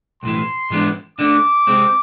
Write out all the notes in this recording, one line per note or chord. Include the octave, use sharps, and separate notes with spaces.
B1 A2 E3 C6
G#2 E3 G#3 B3 D4
D2 D3 A3 D4 D6
C3 G#3 C4